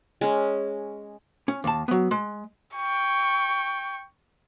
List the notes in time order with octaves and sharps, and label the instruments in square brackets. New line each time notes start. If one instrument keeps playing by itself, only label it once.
[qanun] G#3 C#4
[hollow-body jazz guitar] C#4
D#2 A5
F#3 B3
G#3
[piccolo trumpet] G5 [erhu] C#6